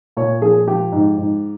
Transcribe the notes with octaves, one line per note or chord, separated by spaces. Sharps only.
A#2 C#5
F3 G#4
F3 G4
G#2
G#2